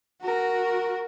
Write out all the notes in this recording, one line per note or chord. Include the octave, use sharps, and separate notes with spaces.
F#4 A#4